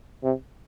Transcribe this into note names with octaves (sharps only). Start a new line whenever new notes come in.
C3